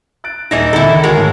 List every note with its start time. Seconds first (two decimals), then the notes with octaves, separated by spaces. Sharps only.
0.24 F#6 A6 D7
0.51 D#1 E3 D#4 E4 F#6 G#6 A#6 C7
0.73 C#2 D3 E4 A4 A#5 B5 E6 G6
0.87 D#3
1.04 G#3 F#4 A#4 C#5
1.16 G#2 A3 A5